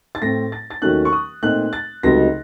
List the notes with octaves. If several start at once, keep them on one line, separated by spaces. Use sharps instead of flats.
A6
A2 A3 C4 A#6
A6
A6
D#2 D#3 F#3 A3 C#4 F#6
C#6
D#6
A#2 A3 C4 D#4 F#6
A6
C#2 C3 F#3 A3 D#4 A#6